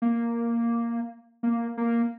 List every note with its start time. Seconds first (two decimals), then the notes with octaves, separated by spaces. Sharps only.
0.02 A#3
1.43 A#3
1.77 A#3